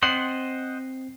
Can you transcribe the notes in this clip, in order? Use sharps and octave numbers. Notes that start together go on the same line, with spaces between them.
C4 C5 D#5 F#5 C7